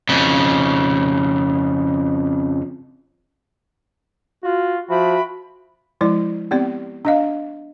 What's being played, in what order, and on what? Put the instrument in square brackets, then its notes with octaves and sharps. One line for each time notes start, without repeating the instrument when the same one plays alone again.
[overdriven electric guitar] F2 C#3
[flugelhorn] F4 [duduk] F#4
[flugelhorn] F3 [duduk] F#4 [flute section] E5 G5 B5
[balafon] F3 G#3 E4 D5
B3 C4 G4 D5
D4 D#5 F5